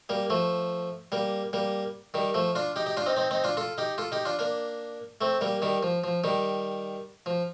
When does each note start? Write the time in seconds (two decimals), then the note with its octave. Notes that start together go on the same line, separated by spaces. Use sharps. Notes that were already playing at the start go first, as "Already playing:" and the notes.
0.09 G3 A#3
0.30 F3 A3
1.12 G3 A#3
1.53 G3 A#3
2.14 D#3 G3
2.34 F3 A3
2.55 D4 F4
2.76 D#4 G4
2.86 D#4 G4
2.97 D4 F4
3.06 C4 D#4
3.16 C4 D#4
3.31 C4 D#4
3.44 D4 F4
3.57 F4 A4
3.78 D#4 G4
3.98 F4 A4
4.12 D#4 G4
4.25 D4 F4
4.39 A#3 D4
5.21 A3 C4
5.41 G3 A#3
5.62 D#3 G3
5.83 F3
6.04 F3
6.24 D#3 G3
7.26 F3